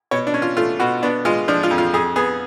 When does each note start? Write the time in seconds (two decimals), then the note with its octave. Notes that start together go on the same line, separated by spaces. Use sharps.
0.11 B2 C#5
0.27 D4
0.34 C#4
0.42 F4
0.57 A3 F4
0.80 B2 F#4
1.03 B3 D4
1.25 G#3 F4
1.48 F3 D4
1.63 F4
1.71 F2
1.78 F4
1.94 F2 G#4
2.16 B3 G#4